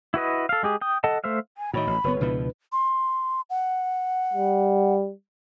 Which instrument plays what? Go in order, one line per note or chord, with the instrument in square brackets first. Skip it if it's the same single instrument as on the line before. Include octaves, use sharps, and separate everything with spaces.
[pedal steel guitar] E4 F#4 B4 D#5
A4 F5
G#3 G4 G#4
G5 D#6
A4 D#5 F#5 A5
A3 C5 E5 F5
[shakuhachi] G#5
[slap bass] A2 D#3 [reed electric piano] F#4 C#5 D#5 [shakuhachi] B5
[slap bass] A1
[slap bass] F#1 B3 [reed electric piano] C#2 B4 C#5
[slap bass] C#2 B2 F3 [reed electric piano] D4 B4 [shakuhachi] E4
[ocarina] C6
F#5
[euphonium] G3